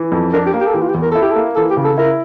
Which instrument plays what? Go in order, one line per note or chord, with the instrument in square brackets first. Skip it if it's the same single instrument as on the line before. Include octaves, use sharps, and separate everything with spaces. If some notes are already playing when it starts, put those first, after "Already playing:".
Already playing: [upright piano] E3
F2
[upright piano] D4 [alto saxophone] A#4
[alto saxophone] G4
[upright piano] A#3
[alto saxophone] G4
A4
[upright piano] E3 [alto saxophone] G4
[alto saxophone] F4
G4
[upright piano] E2
[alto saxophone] A#4
[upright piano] E4 [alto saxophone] A4
[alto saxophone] G4
A4
[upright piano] A#3
[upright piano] E3 [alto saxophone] A4
[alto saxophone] G4
[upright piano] C#3
[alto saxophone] A4
[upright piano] E4 [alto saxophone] A#4